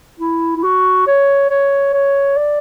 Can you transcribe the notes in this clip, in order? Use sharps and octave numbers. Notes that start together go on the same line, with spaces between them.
E4
E4
F#4
C#5
C#5
C#5
D5